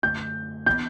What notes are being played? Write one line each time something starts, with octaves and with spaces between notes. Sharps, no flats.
F#2 D3 A3 G6
E3 B3 G6